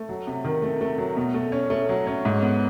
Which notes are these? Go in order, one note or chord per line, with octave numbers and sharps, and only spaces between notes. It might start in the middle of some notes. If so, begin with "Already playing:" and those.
Already playing: A3
F#3
C3
D#3
A3
A3
F#3
B2
A3
C#4
A3
F#3
C#4
G#2
B3